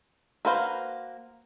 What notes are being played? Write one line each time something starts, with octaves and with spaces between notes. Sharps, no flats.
A#3 F#4 B4 C5 F5